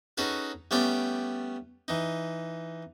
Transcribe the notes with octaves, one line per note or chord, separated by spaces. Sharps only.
C#4 D#4 F#4 G#4 A4 B4
G3 A3 B3 C#4 D5 G5
E3 D#4